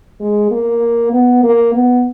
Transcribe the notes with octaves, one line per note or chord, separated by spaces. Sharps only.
G#3
A#3
B3
A#3
B3